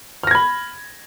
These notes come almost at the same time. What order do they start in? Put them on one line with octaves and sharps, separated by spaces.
F6 A#6 G#6 B5